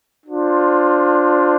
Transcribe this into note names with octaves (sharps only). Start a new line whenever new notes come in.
D4 F4 C5